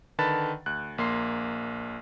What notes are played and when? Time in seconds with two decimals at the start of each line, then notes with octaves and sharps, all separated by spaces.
0.19 D3 D#3 B4 A5 B5 A6
0.66 D2 F#6
0.98 A#1 A#3 C6 C7